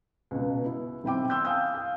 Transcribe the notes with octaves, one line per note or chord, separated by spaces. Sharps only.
C#2 B2
E4
B1 C4 E4 G5 D6
C6 E6 F#6 G6
F5 G#5 A5 D#6 E6 G6
F5 G5